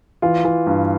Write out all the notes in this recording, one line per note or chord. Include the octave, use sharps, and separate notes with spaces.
E3 F4
E3
G2